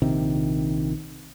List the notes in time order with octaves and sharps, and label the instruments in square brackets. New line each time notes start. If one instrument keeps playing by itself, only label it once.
[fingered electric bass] A#1 C3 D#3